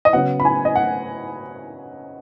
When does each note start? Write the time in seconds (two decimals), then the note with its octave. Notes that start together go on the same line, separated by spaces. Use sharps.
0.05 D#5
0.13 C#3 F#3 B3 F#5
0.40 B5
0.45 G#5
0.65 D#5
0.75 F#5